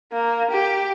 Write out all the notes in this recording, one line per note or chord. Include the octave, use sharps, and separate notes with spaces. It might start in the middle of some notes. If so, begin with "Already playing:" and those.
A#3
G4